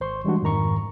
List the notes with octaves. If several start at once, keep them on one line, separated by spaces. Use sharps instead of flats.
G#1 C5 C6 C#6
E3 G3 G#3 D4 F#4
F2 G#2 D#3 A#5 C#6